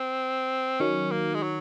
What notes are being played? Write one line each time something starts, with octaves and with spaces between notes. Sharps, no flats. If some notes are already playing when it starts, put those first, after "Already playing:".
Already playing: C4
D#3 F#3 C#4
A#3
G#3
F#3